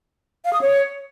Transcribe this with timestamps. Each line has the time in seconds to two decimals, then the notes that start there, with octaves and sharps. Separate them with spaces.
0.45 F5
0.53 D#6
0.61 C#5